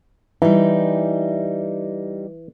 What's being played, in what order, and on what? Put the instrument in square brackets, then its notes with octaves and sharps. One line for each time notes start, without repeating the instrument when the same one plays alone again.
[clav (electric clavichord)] E3 [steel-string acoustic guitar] G3 D#4